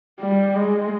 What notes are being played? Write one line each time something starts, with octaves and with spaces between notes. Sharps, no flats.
G3
G#3